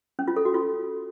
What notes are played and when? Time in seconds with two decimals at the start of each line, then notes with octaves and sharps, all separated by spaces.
0.19 C#4
0.28 F4
0.36 A4
0.45 F#4
0.54 F4